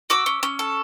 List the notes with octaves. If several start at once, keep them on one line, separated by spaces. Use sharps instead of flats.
F#4 D6 E6
C#4
C#4
A4